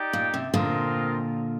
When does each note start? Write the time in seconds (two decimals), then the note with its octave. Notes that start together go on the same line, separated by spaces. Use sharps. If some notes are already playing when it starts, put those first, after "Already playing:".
Already playing: D#4 G4 D5 G5
0.13 A#2
0.34 C3
0.54 A#2 D3 C4 F4 A#4 D#5